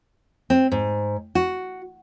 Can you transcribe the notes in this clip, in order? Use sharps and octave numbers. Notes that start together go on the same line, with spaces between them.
C4
G#2
F#4